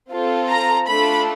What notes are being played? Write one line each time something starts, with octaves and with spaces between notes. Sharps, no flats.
C4 F4 A4
A#5
A3 D4 F4 A4 B5